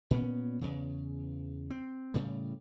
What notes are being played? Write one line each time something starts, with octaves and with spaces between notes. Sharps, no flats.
A#2 B3 C#4
E2 C#3
C4
A2 C#3 G3